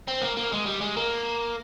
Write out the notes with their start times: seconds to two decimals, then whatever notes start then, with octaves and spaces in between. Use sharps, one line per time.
0.08 C4
0.22 A#3
0.37 A#3
0.53 G#3
0.67 G3
0.81 G#3
0.97 A#3